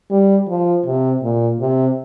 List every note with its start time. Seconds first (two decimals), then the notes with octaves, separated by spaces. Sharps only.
0.11 G3
0.48 F3
0.86 C3
1.22 A#2
1.60 C3